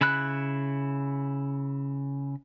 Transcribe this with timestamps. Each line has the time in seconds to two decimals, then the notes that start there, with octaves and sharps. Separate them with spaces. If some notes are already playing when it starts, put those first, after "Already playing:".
0.01 C#3 E4 B5 F#6